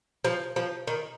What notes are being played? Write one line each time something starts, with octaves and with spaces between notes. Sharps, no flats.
F3
F3
D#3